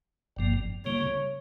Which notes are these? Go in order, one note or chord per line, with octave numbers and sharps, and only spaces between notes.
G1 G2 F3 A#3
C#3 G3 A#3 C#5